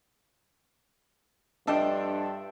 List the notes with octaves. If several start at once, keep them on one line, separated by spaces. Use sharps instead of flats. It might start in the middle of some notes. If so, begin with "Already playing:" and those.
G2 F3 D4 A4 D#5 E5 G5